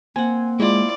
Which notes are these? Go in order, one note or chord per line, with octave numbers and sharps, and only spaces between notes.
A#3 C4 F#5 G#5
G#3 E4 F4 D5